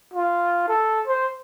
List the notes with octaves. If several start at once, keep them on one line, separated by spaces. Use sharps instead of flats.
F4
A4
C5